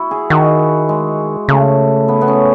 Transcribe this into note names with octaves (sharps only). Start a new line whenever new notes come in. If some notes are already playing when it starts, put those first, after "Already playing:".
Already playing: E4 F#4
G#4
D#3 F#4
G#3
C#3 A3
B3
B3
C#4